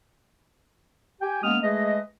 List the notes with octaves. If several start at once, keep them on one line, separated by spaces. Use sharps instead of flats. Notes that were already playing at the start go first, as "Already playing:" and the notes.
G4 G5 G#5
G#3 A#3 B3 C#4 D#6 F6
G#3 A3 G#4 B4 D#5